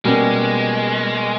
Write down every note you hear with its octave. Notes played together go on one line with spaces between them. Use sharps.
B2 G3 G#3 A#3 C#4